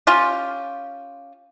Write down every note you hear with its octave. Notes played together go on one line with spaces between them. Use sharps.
C#4 F4 G4